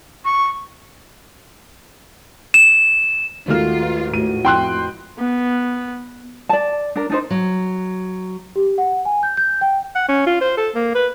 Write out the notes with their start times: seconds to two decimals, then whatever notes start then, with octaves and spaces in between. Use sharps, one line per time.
0.25 C#6
2.54 E7
3.48 D#2 G#3 A3 F4 F#4 F6
3.83 B4
4.14 A2 F4 F#4 D#7
4.45 F2 E4 F#4 G5 C6 F#6
5.18 B3
6.49 D5 A5
6.96 D4 A#4
7.10 D4 D#4 C5
7.31 F#3
8.56 G4
8.78 F#5
9.05 G#5
9.23 G6
9.37 G6
9.61 G5
9.95 F#5
10.09 C#4
10.27 F4
10.41 C5
10.57 A4
10.75 A#3
10.95 B4